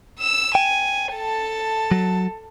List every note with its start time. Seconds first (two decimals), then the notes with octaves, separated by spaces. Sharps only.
0.19 E6 E7
0.55 G5 G#5
1.14 A4 A5
1.92 F#3